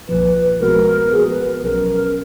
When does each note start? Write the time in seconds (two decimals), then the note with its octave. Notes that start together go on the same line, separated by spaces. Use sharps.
0.08 B1 A#2 F3 B4
0.60 B2 G#3 B3 F#4 A#4 B4
1.12 A#2 F3 B3 F#4 G#4
1.30 B4
1.64 B1 B2 F#3 C#4 A#4